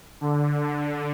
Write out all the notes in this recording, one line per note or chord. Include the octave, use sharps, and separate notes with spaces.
D3
D3